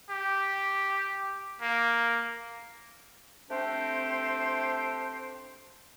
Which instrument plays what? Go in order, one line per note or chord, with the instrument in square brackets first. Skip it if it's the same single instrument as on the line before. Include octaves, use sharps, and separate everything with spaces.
[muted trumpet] G4
A#3
[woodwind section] A3 C4 D4 G4 C5